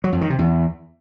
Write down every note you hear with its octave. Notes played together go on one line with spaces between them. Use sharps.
F#3
F2
D#3
C3
E2